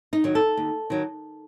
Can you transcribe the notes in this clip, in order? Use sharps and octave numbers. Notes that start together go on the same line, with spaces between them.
D#4
D#3 F#3
A4
D#2
D#3 F#3